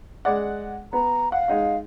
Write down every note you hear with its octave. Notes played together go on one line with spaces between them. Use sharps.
G#3 D5 F#5
B3 A#5
F5 F#5
G#3 D#4 F#5